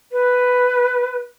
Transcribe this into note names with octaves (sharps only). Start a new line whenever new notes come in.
B4